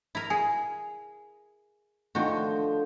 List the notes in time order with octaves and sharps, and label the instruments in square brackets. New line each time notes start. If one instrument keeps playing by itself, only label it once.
[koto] E4 A#4
[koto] G#4 [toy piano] G#5
[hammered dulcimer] D3 F3 [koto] D#3 F#4 [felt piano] A3 G5 G6